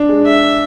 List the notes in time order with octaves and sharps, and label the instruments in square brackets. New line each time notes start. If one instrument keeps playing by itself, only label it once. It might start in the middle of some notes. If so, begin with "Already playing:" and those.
Already playing: [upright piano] D4
G#3
[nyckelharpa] E5